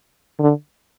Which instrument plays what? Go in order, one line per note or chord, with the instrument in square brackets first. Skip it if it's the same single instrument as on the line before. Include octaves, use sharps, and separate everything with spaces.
[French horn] D3